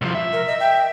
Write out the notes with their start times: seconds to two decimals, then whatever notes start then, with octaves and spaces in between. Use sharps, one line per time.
0.02 C2 F3
0.15 E5
0.33 A#4
0.47 D#5
0.60 G5